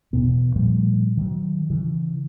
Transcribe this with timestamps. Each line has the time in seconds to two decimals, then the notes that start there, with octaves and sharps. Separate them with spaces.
0.13 E1 B2 B3
0.56 A#2 F3 G3 A3
1.17 D#3 F#3
1.70 C#3 E3